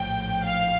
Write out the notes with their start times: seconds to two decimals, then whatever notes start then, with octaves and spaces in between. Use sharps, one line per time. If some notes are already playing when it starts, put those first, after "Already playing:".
Already playing: A#1 A2 F3 G5
0.45 F5